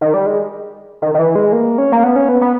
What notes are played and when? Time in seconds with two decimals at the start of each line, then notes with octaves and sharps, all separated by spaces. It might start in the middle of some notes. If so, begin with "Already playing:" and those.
0.01 D#3
0.14 G3
0.26 G#3
1.02 D#3
1.14 D#3
1.19 E3
1.35 G#3
1.53 A#3
1.78 C#4
1.92 A#3
2.04 B3
2.16 C#4
2.29 B3
2.41 B3